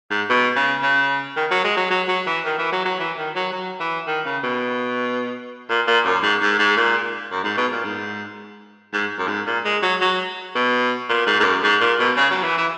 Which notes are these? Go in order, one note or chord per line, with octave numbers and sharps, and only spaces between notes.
G#2
B2
C#3
C#3
D#3
F#3
G#3
F#3
F#3
F#3
E3
D#3
E3
F#3
F#3
E3
D#3
F#3
F#3
E3
D#3
C#3
B2
A#2
A#2
F#2
G#2
G#2
G#2
A#2
F#2
G#2
B2
A#2
G#2
G#2
F#2
G#2
A#2
G#3
F#3
F#3
B2
A#2
G#2
G#2
F#2
G#2
A#2
B2
C#3
F#3
E3
E3